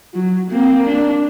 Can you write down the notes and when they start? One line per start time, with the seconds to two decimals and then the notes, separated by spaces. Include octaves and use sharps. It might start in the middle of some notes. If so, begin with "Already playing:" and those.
0.14 F#3
0.51 A#3 C4
0.87 D4